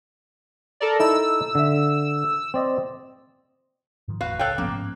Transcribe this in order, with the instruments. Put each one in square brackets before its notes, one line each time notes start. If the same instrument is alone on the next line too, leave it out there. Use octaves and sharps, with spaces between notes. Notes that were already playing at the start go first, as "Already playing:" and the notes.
[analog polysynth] A4 A#4 D5
[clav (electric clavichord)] D#4 E4 A4 [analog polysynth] E6
[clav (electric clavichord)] D3 E5
C4 D5 D#5
[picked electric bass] G#2 D#3 F3
[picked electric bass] G1 E2 A2 [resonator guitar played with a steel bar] F#4 B4 F5
[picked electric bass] C#2 [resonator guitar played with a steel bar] A4 C#5 F5 [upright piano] G5 F#6
[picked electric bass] G1 C2 A2 [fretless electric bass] F3 B3 C#4 [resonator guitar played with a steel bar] A#3
[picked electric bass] G#2